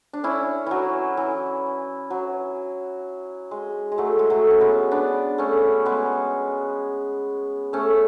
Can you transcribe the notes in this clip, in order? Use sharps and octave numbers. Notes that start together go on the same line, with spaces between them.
D4
C#4 E4
E3 F#3
E3
F#3
G#3
G#3
F#3 A3
G#3
F#3 A3
C#4
G#3 B3
B3 D4
A3 C#4
G#3 B3
A3 C#4